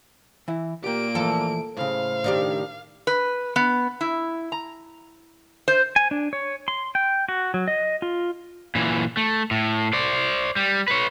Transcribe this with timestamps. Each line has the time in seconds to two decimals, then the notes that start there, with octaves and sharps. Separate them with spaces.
0.48 E3 E4
0.84 A#2 A#3 G4 G5 D7
1.15 E3 F3 A3 A4
1.77 A2 C#3 C5 F5
2.24 D#3 D4 G4
3.07 B4
3.56 B3
4.01 E4
4.52 A#5
5.68 C5
5.96 G#5
6.11 D4
6.33 C#5
6.68 C6
6.95 G5
7.29 F#4
7.54 F#3
7.68 D#5
8.02 F4
8.75 A#2 E3
9.17 A3
9.51 A2
9.93 C5 D5
10.56 G3
10.88 B4 C#5